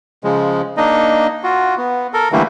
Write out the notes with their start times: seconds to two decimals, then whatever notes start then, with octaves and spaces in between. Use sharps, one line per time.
0.24 C#3 F3 G#3
0.77 A#3 D4 D#4 D#5
1.43 F4 F#4
1.78 B3
2.13 A4 A#4
2.32 D3 E3 G3 A3 A#3